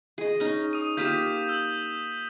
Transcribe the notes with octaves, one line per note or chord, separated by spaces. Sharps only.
G#4 D#5
C#4 D#4
D#6 D#7
A#3 F4 G4 G6 B6 E7
E6 F#7